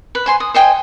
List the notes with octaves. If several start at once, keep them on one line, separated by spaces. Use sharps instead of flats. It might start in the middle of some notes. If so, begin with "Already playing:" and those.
B4
C5 G#5 C6
D#6
C5 D#5 G5 G#5